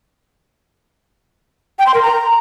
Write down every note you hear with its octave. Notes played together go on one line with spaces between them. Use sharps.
G5
C6
A#4
A#5